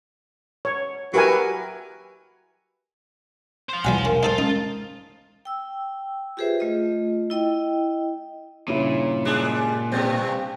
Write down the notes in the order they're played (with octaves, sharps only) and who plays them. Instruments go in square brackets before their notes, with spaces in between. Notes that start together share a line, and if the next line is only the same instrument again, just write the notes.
[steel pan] C#5
[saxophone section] F#3 E4 B4 [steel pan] G4 A#4 G#5
[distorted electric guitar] C5 F5
[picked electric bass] B1 C3 [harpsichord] E2 F#3 F#5 [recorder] G#5
[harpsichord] C#4 [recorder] A#4
[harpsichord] D#4 A4 C5 [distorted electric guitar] F4
[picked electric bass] G#3 C#4 [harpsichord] D#4
[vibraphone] G5 E6
F4 G4 G#4 B4 C5 E5
A3 F4 D#5
E4 D#5 G5
[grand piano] G2 C#3 E4 [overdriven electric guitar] A#2 [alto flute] C#5
[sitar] G3 G#3 D4
[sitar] G2 B2 G3 [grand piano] C4 G6 A6 [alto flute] G5